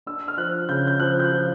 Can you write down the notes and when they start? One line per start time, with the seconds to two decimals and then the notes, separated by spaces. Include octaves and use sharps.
0.06 D4 E6
0.28 F6
0.37 F3 F#6
0.69 C#3 G6
0.87 G6
1.00 F3 F#6
1.20 G6
1.24 F#6
1.32 F3